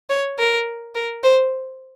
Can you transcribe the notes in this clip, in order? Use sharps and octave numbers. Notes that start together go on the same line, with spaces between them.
C#5
A#4
A#4
C5